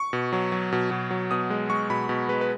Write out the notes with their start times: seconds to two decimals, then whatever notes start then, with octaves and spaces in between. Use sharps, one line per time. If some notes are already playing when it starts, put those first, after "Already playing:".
Already playing: C#6
0.13 B2
0.33 F#3
0.52 F#3
0.72 B2
0.91 B2
1.11 F#3
1.31 B2 D#6
1.50 G#3
1.70 G#3 C#6
1.90 B2 B5
2.09 B2
2.29 G#3 B4
2.41 B4